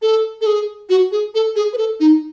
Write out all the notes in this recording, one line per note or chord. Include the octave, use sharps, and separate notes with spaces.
A4
A4
G#4
F#4
G#4
A4
G#4
B4
A4
D#4